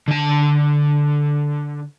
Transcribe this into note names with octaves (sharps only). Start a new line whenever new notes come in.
D3 A5